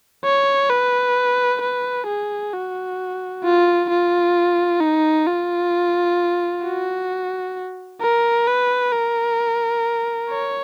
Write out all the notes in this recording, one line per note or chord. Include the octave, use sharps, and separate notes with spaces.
C#5
B4
B4
G#4
F#4
F4
F4
D#4
F4
F#4
A#4
B4
A#4
C#5